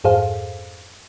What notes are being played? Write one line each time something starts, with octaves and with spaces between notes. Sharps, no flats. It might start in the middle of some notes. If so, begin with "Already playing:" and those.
F2 G#2 G#4 A4 C5 F5